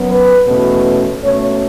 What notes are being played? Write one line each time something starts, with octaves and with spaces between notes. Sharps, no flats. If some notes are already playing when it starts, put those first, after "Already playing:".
Already playing: F#2 F#3 B3
B4
E2 B2 A3 C#4 B4
B2 A3 C#4 C#5